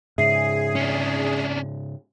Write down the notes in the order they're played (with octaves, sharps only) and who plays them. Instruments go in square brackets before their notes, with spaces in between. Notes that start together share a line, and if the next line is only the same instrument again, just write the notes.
[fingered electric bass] G#2 C#3 [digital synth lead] G#4 [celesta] E5 C7
[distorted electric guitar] C#4 D4